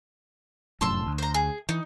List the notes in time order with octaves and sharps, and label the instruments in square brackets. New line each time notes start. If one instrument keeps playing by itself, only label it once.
[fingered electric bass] F1 F#2 A2 [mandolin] A5 C6 E6
[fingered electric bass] D2
[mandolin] C5 A#5
G#4
[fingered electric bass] E3 [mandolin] D#4